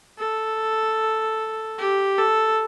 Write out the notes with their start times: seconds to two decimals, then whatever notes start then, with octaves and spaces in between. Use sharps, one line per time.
0.18 A4
1.78 G4
2.18 A4